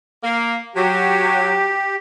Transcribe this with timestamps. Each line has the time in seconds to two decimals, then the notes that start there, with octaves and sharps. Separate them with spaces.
0.22 A#3
0.75 F#3 G4